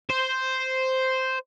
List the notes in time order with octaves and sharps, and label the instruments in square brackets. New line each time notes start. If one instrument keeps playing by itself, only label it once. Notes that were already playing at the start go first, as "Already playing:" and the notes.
[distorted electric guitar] C5